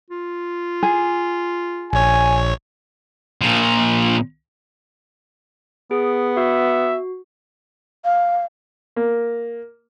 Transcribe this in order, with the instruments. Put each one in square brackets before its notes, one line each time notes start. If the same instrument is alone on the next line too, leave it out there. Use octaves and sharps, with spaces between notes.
[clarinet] F4
[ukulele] G#4
[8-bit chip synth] A#1 C#5 [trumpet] G#5
[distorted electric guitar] A#2 F3
[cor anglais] B3 [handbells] G#4
[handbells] F#4 [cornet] E5
[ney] F5
[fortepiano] A#3